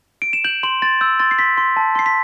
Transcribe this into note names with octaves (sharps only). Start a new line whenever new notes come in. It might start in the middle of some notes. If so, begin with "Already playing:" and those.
D7
E7
G6 F#7
C6 F#7
C6 A6
E6 G6
C6 A6
C7
C6 B6
C6
A5
C6 C7
B6